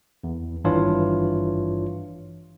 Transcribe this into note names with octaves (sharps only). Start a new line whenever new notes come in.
E2
G#1 G2 E3 D4 F4 C#5